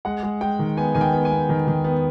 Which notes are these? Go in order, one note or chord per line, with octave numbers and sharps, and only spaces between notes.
G#3 F#5
G#3
G#3 G5
D#3
B3 G#5
D#3 G#5
G5
B3
G#5
B3
D#3
D#3
B3